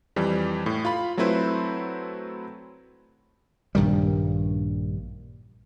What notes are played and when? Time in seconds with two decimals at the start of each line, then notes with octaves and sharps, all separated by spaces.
0.16 F2 E3 G3
0.66 A2
0.85 F4 B5
1.17 F#3 A3 C4 E4 B4 C5
3.75 A#1 G2 D#3 G3